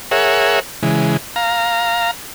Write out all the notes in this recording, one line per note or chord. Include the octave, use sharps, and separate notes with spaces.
G#4 A#4 C#5 E5 F#5
C#3 E3 G#3
F5 A#5